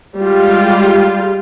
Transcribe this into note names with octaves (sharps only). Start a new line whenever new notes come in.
G3 G#3 F4 G4